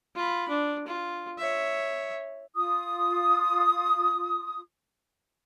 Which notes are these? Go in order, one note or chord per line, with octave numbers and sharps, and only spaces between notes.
F4 B5
D4
F4
C#5 E5
F4 D#6